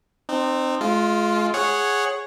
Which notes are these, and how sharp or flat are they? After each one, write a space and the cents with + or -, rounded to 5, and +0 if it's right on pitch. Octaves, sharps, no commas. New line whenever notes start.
C4 +0 D#4 -35
G#3 +40 F4 +0
G#4 +0 C#5 -5 F#5 +0